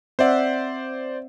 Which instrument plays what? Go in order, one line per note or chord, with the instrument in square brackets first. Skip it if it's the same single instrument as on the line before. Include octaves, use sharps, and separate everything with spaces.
[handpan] C4 E5 F#5 [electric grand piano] C5 D5